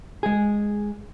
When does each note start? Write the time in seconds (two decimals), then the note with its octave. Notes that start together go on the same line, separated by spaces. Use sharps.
0.23 G#3 G#4